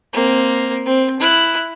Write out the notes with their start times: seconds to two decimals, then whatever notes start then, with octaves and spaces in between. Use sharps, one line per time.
0.13 A#3 C4
0.86 C4
1.20 E4 F#6